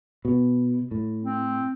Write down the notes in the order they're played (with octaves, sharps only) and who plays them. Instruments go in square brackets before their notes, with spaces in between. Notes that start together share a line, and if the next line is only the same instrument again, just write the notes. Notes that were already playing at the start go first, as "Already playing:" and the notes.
[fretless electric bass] B2
A2
[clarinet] C4